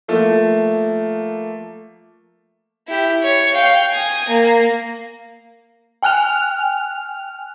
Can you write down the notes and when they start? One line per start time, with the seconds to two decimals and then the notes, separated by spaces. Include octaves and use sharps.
0.08 F3 A3 A#3
2.88 E4 G4
3.23 C#5
3.54 F5 G5
3.91 G#5 D#6
4.28 A#3
6.03 G5 G#5 F6 F#6 F7